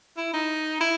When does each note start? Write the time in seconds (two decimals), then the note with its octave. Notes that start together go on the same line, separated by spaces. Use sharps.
0.17 E4
0.33 D#4
0.80 E4